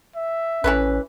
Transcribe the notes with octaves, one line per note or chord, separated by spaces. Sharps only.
E5
A1 E3 A3 C#4 B4